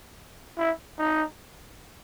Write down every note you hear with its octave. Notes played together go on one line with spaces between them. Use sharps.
E4
D#4